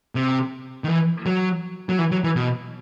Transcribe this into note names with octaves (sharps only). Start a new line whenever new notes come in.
C3
D#3
E3
F#3
F#3
E3
F#3
E3
B2